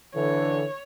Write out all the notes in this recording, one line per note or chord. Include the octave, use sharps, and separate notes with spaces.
D3 E3 C#5